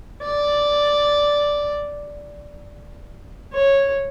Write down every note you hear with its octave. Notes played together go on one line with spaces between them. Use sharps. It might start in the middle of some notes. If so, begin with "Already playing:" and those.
D5
C#5